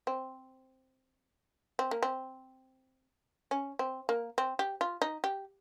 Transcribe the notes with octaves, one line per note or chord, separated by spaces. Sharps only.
C4
C4
A#3
C4
C#4
C4
A#3
C4
G4
F4
D#4
G4